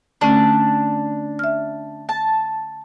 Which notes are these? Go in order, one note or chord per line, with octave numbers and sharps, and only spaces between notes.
D3 A3 C#4 D4
E5 F6
A5